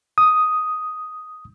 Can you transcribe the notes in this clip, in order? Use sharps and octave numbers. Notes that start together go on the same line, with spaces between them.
D#6